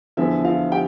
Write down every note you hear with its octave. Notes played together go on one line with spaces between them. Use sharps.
E2 D3 F3 E4 E5
F4 F5
G4 G5